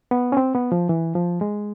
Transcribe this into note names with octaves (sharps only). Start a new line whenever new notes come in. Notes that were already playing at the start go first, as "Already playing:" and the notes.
B3
C#4
C4
B3
F3
E3
F3
G#3